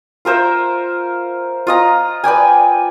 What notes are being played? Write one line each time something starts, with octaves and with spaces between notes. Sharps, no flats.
F4 A#4 C5 E5
F4 D#5 A#5
B4 D5 G5 G#5